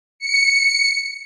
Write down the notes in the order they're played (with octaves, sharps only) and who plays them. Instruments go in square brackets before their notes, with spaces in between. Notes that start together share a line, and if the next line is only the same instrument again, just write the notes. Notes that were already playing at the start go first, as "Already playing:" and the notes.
[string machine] C#7